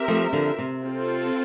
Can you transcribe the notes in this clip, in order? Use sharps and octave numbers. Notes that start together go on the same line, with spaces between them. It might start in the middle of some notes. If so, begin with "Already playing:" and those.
Already playing: C4 G4 A#4 E5
F3 A3
D3 F3
C3
C4 F4 A4